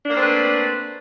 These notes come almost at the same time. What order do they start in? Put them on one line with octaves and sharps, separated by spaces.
D4 A#3 C4 A3 B4